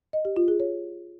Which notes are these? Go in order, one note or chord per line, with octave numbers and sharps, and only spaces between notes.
D#5
G4
F4
G#4
C#5